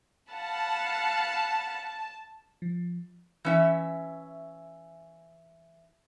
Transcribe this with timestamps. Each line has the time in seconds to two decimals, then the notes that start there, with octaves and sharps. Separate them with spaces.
0.32 F5 F#5 A5 B5
2.62 F3
3.45 E3 C#4 E5